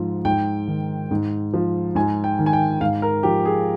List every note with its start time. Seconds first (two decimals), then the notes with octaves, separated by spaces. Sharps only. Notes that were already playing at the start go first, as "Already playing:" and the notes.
Already playing: G#2 F3
0.25 G#2 G5
0.68 D#3
1.11 G#2
1.54 F3
1.95 G#2 G#5
2.24 G5
2.39 D#3
2.46 G#5
2.53 G5
2.81 G#2 F5
3.02 A#4
3.23 F3 G4
3.46 G#4